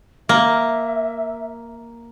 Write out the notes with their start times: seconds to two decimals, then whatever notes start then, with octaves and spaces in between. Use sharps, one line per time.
0.29 A#3 E5